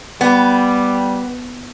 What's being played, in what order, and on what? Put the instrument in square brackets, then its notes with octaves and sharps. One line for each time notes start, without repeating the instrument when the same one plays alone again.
[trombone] G3 [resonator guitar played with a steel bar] B3